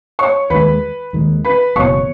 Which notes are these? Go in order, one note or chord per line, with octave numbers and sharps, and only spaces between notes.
C#5 C#6
D#2 D#3 G#3 B4 B5
D#2 D#3 G#3
B4 B5
F#1 E2 B2 C#5 C#6